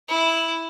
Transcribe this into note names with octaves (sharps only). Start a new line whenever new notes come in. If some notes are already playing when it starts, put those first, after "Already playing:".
E4